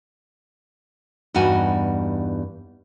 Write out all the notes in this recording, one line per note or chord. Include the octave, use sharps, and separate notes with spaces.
E2 G2 G3 D#4 F#4 G#5